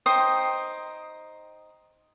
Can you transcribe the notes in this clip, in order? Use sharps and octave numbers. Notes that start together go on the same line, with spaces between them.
D#4 C5 G5 D#6